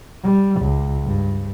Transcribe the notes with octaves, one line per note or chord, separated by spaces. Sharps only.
G3
C#2
G2